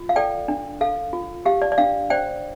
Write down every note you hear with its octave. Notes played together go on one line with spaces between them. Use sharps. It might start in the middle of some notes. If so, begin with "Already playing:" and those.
Already playing: F4
F5
A4 D5 G5
D4
A4 F5
F4
G4 F5
D5
D5
D4 F5
C5 D5 G5